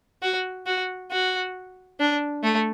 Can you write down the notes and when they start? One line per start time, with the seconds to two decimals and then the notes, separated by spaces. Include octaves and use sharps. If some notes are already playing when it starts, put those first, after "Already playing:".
0.22 F#4
0.66 F#4
1.11 F#4
2.00 D4
2.43 A3